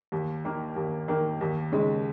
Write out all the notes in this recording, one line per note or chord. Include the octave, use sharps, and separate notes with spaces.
D#2
D#3 A#3
D#2
D#3 A#3
D#2
C#3 G#3 D#4